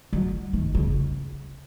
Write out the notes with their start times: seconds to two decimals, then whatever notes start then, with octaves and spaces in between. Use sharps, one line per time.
0.13 F#3
0.53 D#3
0.75 C#3